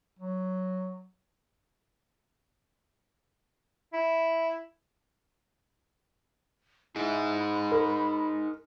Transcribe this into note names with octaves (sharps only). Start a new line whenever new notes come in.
F#3
E4
D#4 E4 G#4
B5
A#4